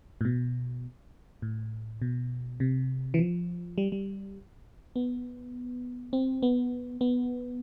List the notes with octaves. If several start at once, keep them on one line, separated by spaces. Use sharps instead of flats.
A2
B2
A2
B2
C3
E3
F3
G3
G3
B3
C4
B3
B3